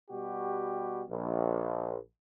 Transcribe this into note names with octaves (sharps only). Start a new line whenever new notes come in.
B2 G3 F#4 G4
A#1